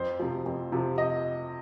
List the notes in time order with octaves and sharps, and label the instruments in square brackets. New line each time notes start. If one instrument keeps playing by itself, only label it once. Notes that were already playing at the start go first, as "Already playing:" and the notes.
Already playing: [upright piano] F2 C5
C3 F3
F2
C3 F3
D#5